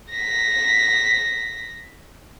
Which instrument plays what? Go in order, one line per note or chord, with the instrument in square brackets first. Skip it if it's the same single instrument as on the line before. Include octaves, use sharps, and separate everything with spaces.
[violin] A#6 B6